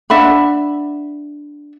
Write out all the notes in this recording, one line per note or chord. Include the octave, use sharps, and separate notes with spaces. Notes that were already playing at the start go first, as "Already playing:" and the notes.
D4 E5 F#5 B5